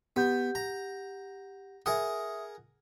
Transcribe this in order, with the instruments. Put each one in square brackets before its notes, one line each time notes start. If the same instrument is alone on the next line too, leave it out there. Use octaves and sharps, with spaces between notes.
[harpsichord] B3 [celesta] G4 F#5 G6
[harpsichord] A#5
[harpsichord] G#4 A#4 F#5 [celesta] E5 D#6